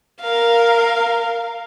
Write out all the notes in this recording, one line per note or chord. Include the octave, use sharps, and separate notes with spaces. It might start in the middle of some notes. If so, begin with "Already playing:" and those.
A#4 F5